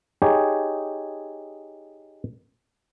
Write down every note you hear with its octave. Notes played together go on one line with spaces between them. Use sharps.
D#4 G4 G#4 C#5